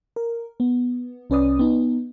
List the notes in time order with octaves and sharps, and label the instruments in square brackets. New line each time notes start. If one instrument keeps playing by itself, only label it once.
[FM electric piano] A#4
B3
C2 C#4 B4 D5 D#6
B3 D#4